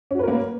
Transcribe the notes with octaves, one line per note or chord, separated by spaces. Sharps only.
A#3 C#4 F#4 A#4 B4